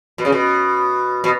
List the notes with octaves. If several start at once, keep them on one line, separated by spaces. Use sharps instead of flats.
B2
C#3
B2
B2